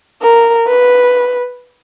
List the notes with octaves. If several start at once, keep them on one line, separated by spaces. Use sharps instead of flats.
A#4
B4